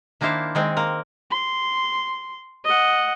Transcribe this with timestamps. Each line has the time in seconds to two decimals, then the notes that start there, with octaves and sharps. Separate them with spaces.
0.21 D#3 A#3 D4 E4 C5 F5
0.55 D#3 G#3 C4
0.77 A#3 A#4
1.30 C6
2.64 D#5 F#5